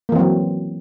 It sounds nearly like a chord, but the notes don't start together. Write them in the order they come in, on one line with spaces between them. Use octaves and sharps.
A#3 E3 C4 F#3